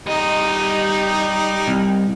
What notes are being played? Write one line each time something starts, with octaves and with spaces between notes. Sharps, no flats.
G3 D#4 D#5
C2